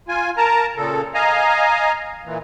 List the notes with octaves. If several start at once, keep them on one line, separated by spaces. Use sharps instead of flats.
F4 G#5
A#4 A5 A#5
A#2 C#3 A4
D#5 F5 G#5 A#5
A#2 E3